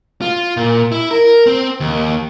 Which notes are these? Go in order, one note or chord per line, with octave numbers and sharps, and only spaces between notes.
F4
A#2
E4
A#4
C4
D#2